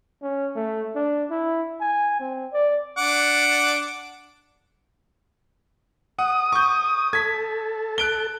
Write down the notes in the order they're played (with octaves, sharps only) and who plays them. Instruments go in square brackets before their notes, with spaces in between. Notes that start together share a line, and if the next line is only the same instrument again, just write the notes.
[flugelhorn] C#4
A3
D4
E4
G#5
C4
D5
[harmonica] D4 F#5 D6
[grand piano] F#5 [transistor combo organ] D#6
[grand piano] C#6 G6
[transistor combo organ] A4 [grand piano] G#6 B6
[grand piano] F#6 D7 G7